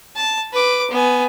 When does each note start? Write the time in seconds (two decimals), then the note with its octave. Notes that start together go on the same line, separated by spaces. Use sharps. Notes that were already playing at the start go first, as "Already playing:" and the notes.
0.16 A5
0.52 B4 D6
0.91 B3 G#5